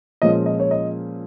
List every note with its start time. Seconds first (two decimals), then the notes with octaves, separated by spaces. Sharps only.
0.22 A#2 F3 G#3 C#4 D#5
0.46 D#5
0.60 C#5
0.71 D#5